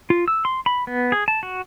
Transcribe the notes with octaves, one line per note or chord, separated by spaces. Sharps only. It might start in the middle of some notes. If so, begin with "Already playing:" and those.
F4
E6
C6
B5
B3
G#4
A5
F#4